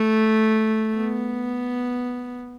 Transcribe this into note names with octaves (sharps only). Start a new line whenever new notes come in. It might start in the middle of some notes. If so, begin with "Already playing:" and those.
Already playing: A3
B3